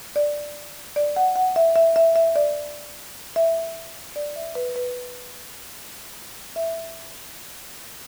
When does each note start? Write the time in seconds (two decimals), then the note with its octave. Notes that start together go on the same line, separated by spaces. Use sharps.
0.16 D5
0.96 D5
1.16 F#5
1.36 F#5
1.56 E5
1.76 E5
1.96 E5
2.16 E5
2.36 D5
3.36 E5
4.16 D5
4.36 E5
4.55 B4
4.76 B4
6.56 E5